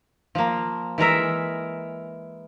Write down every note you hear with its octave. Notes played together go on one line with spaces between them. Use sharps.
F3 A#3
E3 G#3 A#4 E5